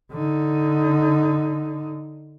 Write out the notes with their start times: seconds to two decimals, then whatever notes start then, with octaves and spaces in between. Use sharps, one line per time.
0.12 D3 D#4